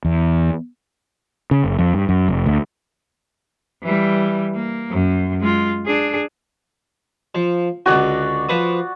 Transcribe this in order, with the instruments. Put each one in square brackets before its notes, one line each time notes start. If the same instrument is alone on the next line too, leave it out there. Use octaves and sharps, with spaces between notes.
[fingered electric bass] E2
C#3
F#1
F2
G2
F#2
F1
D2
[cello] E3 G3
A#3
F#2
G#3 F4
D4 G#4
[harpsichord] F3
[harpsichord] C#2 D3 G#5 [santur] F#4 D5
[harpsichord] F3 B4 D#6